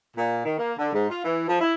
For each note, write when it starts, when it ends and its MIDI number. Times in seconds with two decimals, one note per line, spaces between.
0.17 0.44 46
0.45 0.55 51
0.58 0.72 58
0.79 0.92 50
0.93 1.09 44
1.10 1.22 65
1.24 1.46 52
1.47 1.59 53
1.60 1.73 64